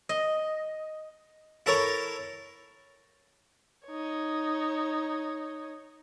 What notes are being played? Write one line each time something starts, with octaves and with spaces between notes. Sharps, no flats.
D#5
E4 A4 A#4 C#5
D#4 C#5